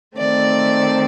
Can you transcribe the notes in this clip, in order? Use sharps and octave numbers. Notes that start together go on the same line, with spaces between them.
D#3 A3 C4 D5